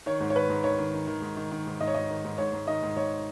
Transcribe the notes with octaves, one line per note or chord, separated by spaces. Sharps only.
D#3 C#5
G#2
C#5
D#3 B4
G#2
D#3 C#5
D#3
D#3
D#3
G#2
D#3
D#3
G#2
G#2 D#5
C#5
G#2 D#5
D#3
G#2
G#2 C#5
G#2
D#3 D#5
G#2
G#2 C#5